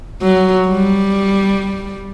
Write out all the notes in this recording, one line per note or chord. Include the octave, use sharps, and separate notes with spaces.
F#3
G3